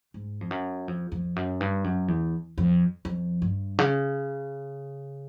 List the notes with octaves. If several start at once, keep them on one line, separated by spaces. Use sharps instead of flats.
G#2
F2
F#2
F2
F2
F#2
G2
F#2
E2
F2
F2
G2
C#3